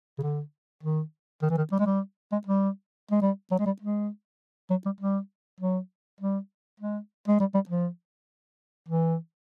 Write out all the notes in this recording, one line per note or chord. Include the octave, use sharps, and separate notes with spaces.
C#3
D3
D#3
D#3
E3
D#3
G3
G#3
G3
G#3
G3
G#3
G3
F#3
G#3
G3
G#3
F#3
G3
G3
F#3
G3
G#3
G#3
G3
G3
F3
E3